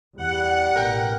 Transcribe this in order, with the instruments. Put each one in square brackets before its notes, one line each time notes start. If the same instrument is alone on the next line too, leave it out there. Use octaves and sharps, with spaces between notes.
[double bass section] E2 [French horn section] G3 [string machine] F#5
[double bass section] A1 B2 [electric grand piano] A#4 G5